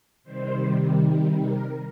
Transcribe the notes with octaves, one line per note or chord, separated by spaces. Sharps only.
C3 D#3 G3 C5
A#4